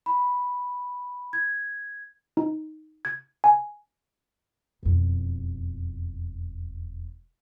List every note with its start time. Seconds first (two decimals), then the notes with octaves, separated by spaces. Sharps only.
0.06 B5
1.33 G#6
2.37 D#4
3.05 G#6
3.44 G#5
4.83 E1 F2